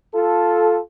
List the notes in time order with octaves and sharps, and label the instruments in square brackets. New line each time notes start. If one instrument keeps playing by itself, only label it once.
[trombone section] F4 A4